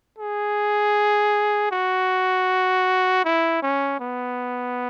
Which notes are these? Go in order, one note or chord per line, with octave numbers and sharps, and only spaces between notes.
G#4
F#4
E4
C#4
B3